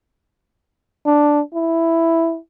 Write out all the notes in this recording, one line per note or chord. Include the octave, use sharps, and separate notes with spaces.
D4
E4